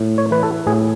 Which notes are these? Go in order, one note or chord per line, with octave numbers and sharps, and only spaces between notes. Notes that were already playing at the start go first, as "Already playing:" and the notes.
Already playing: A2
C#5
E3 B4
A4
A2 G#4